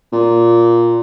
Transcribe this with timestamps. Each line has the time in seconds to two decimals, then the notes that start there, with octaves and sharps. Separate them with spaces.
0.12 A#2